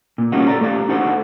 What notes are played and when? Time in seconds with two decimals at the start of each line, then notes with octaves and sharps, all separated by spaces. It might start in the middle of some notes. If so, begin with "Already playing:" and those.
0.18 A#2
0.32 G3 A#3 C#4 D#4 F4 F#4
0.47 A4 A#4 D5 A#5
0.61 A3 G4 D5 F5
0.89 D4 D#4 F#4 A4 C5 F#5